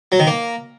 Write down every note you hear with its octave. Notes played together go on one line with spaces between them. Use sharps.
F#3
D#3
A#3